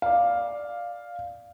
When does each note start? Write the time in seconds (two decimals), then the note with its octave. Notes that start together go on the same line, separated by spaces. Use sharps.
0.02 D5 F5